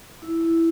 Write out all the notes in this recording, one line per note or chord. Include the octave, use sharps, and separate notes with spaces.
E4
E4